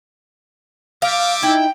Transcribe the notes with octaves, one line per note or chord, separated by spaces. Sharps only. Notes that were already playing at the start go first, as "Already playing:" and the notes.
G3 E5 F5 D6
D#4 E4 G5